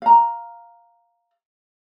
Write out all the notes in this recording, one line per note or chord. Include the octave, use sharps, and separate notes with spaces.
F5 A#5